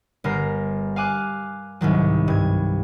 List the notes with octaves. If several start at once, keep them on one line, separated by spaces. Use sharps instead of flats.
G1 A#4 A#5 C7
F5 G#5 D6 F#6
C2 G#2 D#3 F#3
G2 G#6